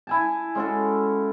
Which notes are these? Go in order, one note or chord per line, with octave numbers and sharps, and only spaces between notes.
E4 G#5 A5
G#3 C#4 F#4 A4